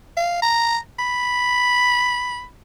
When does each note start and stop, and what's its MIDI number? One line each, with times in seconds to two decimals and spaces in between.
0.17 0.41 77
0.42 0.77 82
0.99 2.45 83